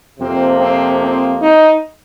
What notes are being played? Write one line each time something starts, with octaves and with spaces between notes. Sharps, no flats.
F2 C3 F3 A#3 C4
C4
C4
D#4